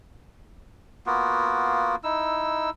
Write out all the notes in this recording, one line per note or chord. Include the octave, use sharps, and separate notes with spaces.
A#3 B3 F4 F#4
D#4 E4 E6